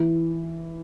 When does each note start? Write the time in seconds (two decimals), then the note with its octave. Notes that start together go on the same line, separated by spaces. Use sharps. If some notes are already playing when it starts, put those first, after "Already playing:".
Already playing: E3